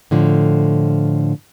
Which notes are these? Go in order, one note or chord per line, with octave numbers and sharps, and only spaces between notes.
A2 D3 F3